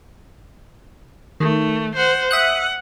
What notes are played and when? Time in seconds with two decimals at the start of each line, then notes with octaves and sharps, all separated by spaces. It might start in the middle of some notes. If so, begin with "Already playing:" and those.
1.40 D#3 A3
1.95 C5 F#5
2.31 E5 F#5 D#6 F#6